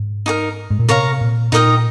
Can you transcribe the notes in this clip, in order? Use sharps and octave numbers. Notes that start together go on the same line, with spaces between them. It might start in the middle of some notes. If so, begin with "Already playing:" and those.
Already playing: G#2
D#4 G4 A#4
G#2
A#2
C3 A#4 C#5 F5 A#5
A#2
A#2 D#4 A#4 D#5 G5